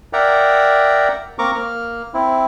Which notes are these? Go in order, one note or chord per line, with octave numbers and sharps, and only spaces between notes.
A#4 D5 E5 F#5 G5 A#5
A#3 C4 A#4 A#5 C#6 D6
A#3 F6
C4 E4